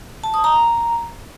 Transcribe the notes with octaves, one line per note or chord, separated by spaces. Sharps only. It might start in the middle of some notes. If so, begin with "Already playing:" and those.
A5
D#6
A#5